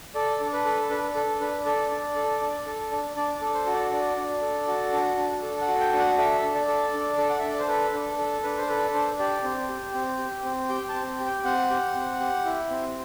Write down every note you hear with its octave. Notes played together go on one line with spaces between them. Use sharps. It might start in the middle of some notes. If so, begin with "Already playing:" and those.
A4 D5
D4
B4
A4
D4 B4
A4
D4 B4
A4 D5
D4
A4
D4
A4
D4
D4 D5
D5
A4
C5
F#4
D5
D4 D5
D4
A4
F#4
D4
D4
A4
F#5
F#4
G5
D4
F#5
A4 E5
D4
D5
A4
D4
A4
F#5
E5
D4
D5
C5
A4 B4
D4
A4
D4 B4
C5
A4 B4
D4 C5
G4 D5
C4
G4
C4
G4
C4
G4 G5
A5
C4
G4
G5
C4 F#5
G4
C4
G4
E4
C4